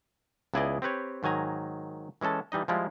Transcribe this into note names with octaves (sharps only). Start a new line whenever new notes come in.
C#2 B3 E4 G#4 D5 D#5
C4 G4 B4 C#5
G#2 D#3 F#3 G#5 A#5
E3 G#3 C#4 A4 A5
E3 G3 D#4 D#5
F3 G3 G#3 E4 F4